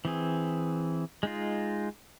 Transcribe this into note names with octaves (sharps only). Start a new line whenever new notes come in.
E3 C4 G#4
G#3 D#4 F4